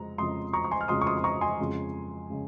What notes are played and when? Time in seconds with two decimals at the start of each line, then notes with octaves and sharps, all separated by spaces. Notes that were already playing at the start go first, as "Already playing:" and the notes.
Already playing: F2 C#3 G#3 A#5
0.18 F2 C#3 G#3 C6 D#6
0.53 A#5 C#6
0.64 C#6
0.71 G#5 C6
0.81 F6
0.88 F2 C#3 G#3 C6 D#6
1.01 C#6
1.06 C6 D#6
1.17 C6
1.24 A#5 C#6
1.41 G#5 C6
1.60 F2 C#3 G#3
2.30 C#3 G#3